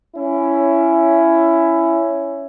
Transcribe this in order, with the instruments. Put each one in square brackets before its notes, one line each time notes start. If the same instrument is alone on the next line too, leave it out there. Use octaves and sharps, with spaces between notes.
[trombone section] C#4 E4